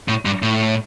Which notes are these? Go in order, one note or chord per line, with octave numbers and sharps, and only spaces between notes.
A2
G2
A2